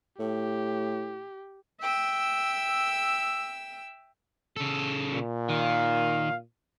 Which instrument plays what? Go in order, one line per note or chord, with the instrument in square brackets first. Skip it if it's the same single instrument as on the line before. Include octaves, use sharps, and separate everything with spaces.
[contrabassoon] A2 [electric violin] G4
[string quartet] E5 G5 E6
[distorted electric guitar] C#3 A4
[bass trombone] A#2
[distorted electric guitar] D#3 [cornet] F5